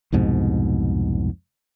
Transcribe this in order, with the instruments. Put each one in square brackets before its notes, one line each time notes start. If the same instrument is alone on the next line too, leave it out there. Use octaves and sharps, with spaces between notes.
[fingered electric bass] C2 F2 G#2 B2